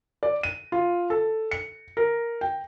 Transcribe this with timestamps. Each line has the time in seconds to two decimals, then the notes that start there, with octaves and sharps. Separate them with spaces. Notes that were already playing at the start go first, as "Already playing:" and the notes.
0.23 D5
0.43 D#7
0.72 F4
1.10 A4
1.51 C#7
1.97 A#4
2.41 G5